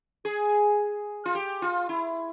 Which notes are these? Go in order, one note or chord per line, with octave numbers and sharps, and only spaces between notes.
G#4
F4
G4
F4
E4